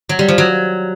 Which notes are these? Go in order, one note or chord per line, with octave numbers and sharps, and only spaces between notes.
F#3
G3
F3
F#3